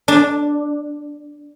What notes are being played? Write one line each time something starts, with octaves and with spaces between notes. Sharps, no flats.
D4